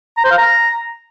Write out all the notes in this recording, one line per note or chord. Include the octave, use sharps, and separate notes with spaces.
A#5
C5
F5
A#5